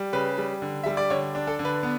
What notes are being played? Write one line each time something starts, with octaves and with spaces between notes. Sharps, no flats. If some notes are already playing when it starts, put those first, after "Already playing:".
Already playing: G3
C#3 B4
G3
D3
G3 E5
D5
D3 C#5
D4
A4
D3
B4
B3